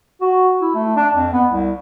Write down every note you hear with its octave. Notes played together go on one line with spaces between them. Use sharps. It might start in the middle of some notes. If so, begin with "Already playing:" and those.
F#4
E4
A3
D4
F2
B3
C2